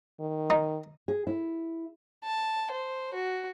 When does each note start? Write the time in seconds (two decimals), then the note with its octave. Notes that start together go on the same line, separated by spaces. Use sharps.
0.20 D#3
0.50 D#4
1.08 G#4
1.27 E4
2.24 A5
2.71 C5
3.14 F#4